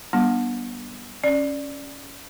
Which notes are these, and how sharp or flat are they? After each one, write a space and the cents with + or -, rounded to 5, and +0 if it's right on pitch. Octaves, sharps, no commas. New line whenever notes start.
G3 -25 B3 -35 D4 +0
C#4 +0 D5 +0